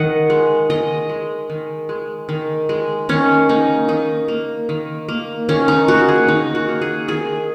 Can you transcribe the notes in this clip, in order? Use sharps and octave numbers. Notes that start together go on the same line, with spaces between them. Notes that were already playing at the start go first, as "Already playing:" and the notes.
Already playing: D#3 D#5 F#5
G#3
D#3 D#5
G#3
D#3
G#3
D#3
G#3
D#3 C#4
A#3 D#4
D#3 D#4
A#3
D#3
A#3
D#3 C#4
D#4
A#3 F#4
G#4
D#3 D#4
F#4
A#3
G#4
D#3 G#4